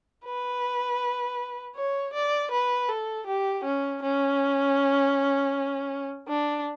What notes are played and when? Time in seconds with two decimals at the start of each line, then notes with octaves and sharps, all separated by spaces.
0.25 B4
1.75 C#5
2.13 D5
2.51 B4
2.88 A4
3.26 G4
3.64 C#4
4.02 C#4
6.28 D4